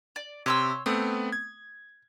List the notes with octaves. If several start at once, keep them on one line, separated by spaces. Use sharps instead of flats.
D5
C3 C#5 C6 E6
A3 B3 C4 D#6
G#6